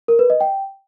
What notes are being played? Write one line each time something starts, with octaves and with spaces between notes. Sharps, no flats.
A#4
B4
D#5
G5